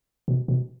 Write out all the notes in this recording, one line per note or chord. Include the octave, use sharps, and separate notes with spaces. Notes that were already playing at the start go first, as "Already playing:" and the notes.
B2
B2